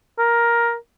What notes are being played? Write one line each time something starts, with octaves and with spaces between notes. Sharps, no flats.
A#4